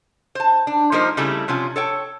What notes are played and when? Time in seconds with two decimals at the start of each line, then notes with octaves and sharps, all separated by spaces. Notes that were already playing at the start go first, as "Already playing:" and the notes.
0.35 C5 A5
0.67 D4
0.92 F3 G3 A#3 D#4 A#4 C5
1.17 C#3 G3 A3 C4 E4
1.48 C3 F3 C#4 F4
1.76 A4 C#5 G5